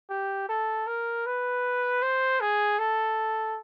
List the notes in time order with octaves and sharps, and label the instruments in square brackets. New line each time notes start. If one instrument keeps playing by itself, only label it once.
[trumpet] G4
A4
A#4
B4
C5
G#4
A4